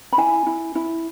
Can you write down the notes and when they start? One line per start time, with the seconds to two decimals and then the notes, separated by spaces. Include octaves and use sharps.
0.13 B5
0.18 E4 G#5
0.47 E4
0.75 E4